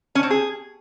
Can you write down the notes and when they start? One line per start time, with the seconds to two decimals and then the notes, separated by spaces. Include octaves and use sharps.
0.15 C#4
0.23 C4
0.30 G#4